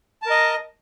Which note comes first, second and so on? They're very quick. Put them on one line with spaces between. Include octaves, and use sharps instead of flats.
A5 A#4 D#5